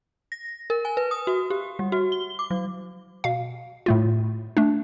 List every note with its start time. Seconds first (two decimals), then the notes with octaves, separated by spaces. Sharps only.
0.32 A#6
0.70 A#4
0.85 G#5
0.97 B4
1.11 D#6
1.27 F#4
1.50 G4
1.79 G3
1.92 F#4
2.12 G7
2.39 D6
2.50 F#3
3.24 B2 F5
3.86 A2 A3 F4
4.57 A3 D4